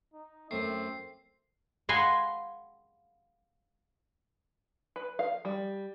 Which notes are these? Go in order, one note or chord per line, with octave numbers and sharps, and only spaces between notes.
D#4
F#2 A3 C4 C7
D#5 F5 F#5 G#5 B5 C6
B4
F5
G3